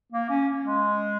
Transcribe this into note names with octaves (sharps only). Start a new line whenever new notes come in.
A#3
C#4
G#3